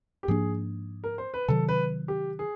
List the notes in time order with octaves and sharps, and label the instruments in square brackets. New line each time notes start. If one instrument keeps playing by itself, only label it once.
[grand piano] G4
[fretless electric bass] G#2 F3 A#3 D4 [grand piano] G#4
[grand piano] A#4
C5
B4
[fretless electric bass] C3 D#3 F#3 [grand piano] A4
[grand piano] B4
G4
G#4